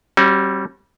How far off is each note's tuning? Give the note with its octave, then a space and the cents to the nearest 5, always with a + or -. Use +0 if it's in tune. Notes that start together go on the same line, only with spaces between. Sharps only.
G3 -10 C#4 -45 F#4 +0